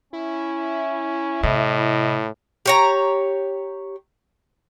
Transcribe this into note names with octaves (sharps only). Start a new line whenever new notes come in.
C#4 E4
A2 C3 D#5
G4 C#5 A#5